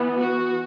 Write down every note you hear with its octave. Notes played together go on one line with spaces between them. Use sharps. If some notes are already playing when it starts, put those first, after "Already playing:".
Already playing: E3 B3
F#4